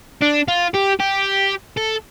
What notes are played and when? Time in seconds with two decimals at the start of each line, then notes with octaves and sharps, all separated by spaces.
0.22 D4
0.48 F4
0.74 G4
1.00 G4
1.77 A4